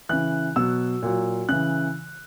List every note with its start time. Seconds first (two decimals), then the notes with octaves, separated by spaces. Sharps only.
0.09 C#3 E3 F#6
0.56 B2 F#3 E6
1.03 A#2 F#3
1.49 C#3 E3 F#6